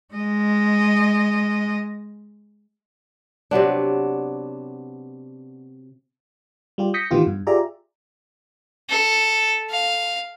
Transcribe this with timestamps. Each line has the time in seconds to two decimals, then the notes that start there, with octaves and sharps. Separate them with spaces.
0.15 G#3 D#5
3.51 C3 F#3 B3 D4
6.78 G3 F4 G4
6.94 D#6 G6 A#6 B6 C#7
7.11 A2 D#3 E3 B3 F4 G4
7.27 G2
7.47 F4 G4 G#4 D5 E5 A#5
8.89 A4
9.70 F5